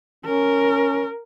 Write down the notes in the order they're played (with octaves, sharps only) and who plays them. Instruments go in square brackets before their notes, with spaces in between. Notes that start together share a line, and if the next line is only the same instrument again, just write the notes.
[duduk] C#4 [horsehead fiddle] A#4